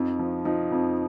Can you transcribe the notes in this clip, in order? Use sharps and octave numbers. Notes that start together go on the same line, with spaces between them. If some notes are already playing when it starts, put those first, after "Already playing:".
Already playing: F2 D#4
F3
F3 D#4
F2